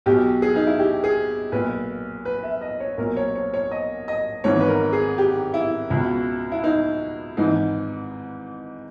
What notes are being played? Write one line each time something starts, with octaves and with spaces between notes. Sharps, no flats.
B1 B2 G4
G#4
D#4
E4
G4
G#4
B1 A#2 B4
B4
E5
D#5
C#5
B1 A#2 A#4
C#5
C#5
C#5
D#5
D#5
G#1 G#2 E3 C#5
B4
A#4
G#4
G4
E4
C#2 B2
E4
D#4
G#1 G#2 E3 D#4